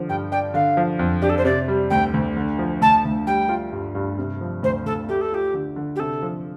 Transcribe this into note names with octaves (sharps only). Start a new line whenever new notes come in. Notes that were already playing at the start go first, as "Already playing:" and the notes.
Already playing: D3 F3
G2 G5
D4 G5
D3 F5
F3
F2
D4 G4
A4
C5
C3 D5
G3
D2 G5
D2
D3
F3
D2 A5
D2
G3 G5
F4
G2
G2
C3
F3
D2 C5
D2 A4
A3 G4
A4
F4 G4
D3
D3
G4
C3 A4
F3